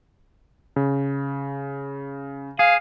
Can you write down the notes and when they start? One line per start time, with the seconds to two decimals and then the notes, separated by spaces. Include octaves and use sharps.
0.76 C#3
2.59 G#4 F5